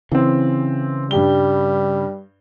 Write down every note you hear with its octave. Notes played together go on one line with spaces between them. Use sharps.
C#3 E3 C4
G2 G3 G4 G7